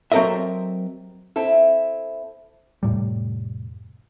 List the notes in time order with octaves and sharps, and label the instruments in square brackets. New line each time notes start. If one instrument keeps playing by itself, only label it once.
[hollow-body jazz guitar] F#3 C4 A4 A#4 D#5 E5
[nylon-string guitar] C4 E4 A4
[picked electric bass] F1 A2 G3